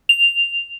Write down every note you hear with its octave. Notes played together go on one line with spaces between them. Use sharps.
F7